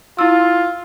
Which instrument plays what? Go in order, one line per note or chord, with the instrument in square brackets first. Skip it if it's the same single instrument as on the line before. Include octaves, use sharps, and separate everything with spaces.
[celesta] E4 E6 [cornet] F4